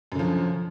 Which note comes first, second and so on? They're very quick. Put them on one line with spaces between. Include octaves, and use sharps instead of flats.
F#2 D3 F3